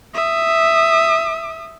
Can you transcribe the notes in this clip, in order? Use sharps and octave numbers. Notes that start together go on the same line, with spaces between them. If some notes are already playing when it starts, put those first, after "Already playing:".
E5 D#6